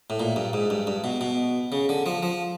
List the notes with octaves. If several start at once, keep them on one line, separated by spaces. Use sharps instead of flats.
A2
A#2
G2
G#2
G2
G2
B2
B2
C#3
D3
F3
F3